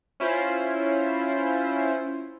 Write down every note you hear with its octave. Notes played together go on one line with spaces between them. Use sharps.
C#4 E4 F4 C5